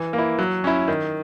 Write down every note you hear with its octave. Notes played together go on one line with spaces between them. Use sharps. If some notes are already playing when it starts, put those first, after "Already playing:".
Already playing: E3
A#3
E4
F#3
C#4 E4
D#3